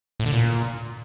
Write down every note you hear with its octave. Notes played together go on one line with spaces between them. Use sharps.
A2
D3
A#2